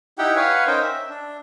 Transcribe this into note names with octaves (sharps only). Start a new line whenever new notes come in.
D#4 E4 G4 F#5 G5
B4 C#5 F5 F#5 G#5
C#4 D#4 A#4 C5 G5
E5
D4